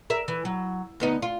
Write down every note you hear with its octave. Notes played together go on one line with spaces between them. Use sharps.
A#4 E5
E3
F#3
D2 B3 D#4
F4